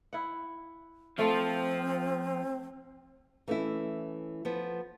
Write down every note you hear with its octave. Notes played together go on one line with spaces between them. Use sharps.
E4 F#5
F3 A3 C4 F4
E3 A3 C#4 E4
F3 B3